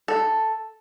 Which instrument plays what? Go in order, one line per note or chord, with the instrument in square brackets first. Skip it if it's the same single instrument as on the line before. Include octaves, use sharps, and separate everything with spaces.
[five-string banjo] A4